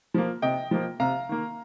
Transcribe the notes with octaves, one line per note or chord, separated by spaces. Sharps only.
F3 A#3
C3 D#5 G5
F3 A#3
C3 F5 A#5
D#3 A#3